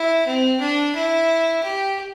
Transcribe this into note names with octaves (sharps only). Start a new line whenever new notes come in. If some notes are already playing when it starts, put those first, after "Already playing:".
Already playing: E4
C4
D4
E4
G4